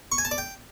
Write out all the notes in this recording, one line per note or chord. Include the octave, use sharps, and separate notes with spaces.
C#6
G#5
A5
D5
G5